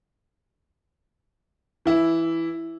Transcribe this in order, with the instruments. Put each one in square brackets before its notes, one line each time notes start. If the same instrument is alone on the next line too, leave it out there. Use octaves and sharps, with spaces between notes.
[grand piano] E3 E4